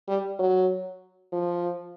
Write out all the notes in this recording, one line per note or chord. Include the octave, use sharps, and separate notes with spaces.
G3
F#3
F3